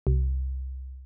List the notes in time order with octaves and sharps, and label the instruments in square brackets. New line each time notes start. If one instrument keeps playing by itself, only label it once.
[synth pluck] C2